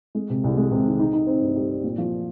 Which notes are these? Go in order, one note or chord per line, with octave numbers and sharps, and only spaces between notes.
G#3
C3
C2
G#3
C3
D#3
D#4
D#4
C4
G2
G3
C4
A#2
F3